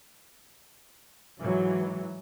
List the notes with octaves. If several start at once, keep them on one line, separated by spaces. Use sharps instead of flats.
G#2 E3 F#3